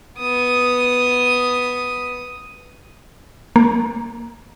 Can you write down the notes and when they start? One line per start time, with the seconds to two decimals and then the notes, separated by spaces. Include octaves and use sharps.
0.18 B3 D#6
3.56 A#3